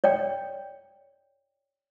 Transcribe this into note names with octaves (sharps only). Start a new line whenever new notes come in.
C#5 D5 G5